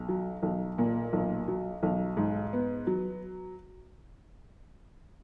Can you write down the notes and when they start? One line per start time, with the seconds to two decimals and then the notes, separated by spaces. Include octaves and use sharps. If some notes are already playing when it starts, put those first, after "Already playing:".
Already playing: B1
0.09 F#3
0.43 B1
0.78 A#2
1.13 B1
1.48 F#3
1.83 B1
2.17 G#2
2.53 B3
2.87 F#3